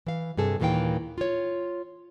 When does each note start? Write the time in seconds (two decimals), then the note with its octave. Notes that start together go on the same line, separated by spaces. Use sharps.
0.07 E3 F5
0.37 G2 C3 G#4 A4
0.60 D#2 A#2 D#3 E3 F5 G5
1.18 F4 C#5